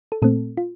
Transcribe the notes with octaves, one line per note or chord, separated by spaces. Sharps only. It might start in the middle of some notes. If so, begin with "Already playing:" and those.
A4
A#2 A3 C4 A4
F4